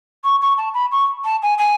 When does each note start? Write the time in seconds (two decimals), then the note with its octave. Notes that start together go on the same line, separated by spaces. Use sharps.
0.24 C#6
0.42 C#6
0.57 A5
0.74 B5
0.92 C#6
1.25 A5
1.43 G#5
1.58 G#5